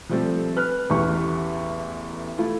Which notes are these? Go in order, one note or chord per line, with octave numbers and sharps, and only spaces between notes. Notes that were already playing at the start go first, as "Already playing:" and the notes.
F3 G3 A3 C4 A4
B4 F6 F#6
A1 E2 A3 G4 C#6
A3 E4 F4 A4